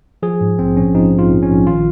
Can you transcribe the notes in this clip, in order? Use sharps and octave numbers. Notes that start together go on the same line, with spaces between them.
F3 G#4
G#2
A#1 C4
A#1 C#4
F3 D#4
G#2
F4
A#1
C#4
A#1
D#3 F4